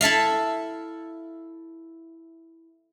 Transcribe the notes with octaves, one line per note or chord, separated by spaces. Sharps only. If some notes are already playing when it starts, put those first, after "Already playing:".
E4 A4 E5 F5